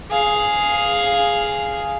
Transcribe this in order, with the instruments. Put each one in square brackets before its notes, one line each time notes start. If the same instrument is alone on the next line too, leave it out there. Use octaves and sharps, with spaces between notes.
[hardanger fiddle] G#4 F5